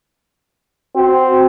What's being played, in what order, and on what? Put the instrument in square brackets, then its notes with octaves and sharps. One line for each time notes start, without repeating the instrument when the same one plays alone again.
[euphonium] C4 [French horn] F#4